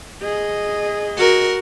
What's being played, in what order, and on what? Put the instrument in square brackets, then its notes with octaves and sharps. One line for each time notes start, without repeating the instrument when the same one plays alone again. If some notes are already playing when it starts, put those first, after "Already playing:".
[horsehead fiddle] G#4 D#5
[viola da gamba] F#4 A#4